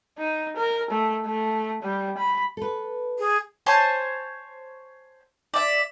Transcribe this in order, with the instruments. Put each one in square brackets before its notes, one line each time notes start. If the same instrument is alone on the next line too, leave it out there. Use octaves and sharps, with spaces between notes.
[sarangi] D#4
A#4
A3
A3
G3
B5
[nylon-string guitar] A4 B4
[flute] G#4
[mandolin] C5 C#5 G#5 A5
D5 E5